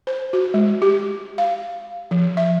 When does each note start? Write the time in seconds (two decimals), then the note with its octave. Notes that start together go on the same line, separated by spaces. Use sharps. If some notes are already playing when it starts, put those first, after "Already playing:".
0.07 C5
0.33 F#4
0.54 G#3
0.82 G4
1.38 F5
2.11 F3
2.37 E5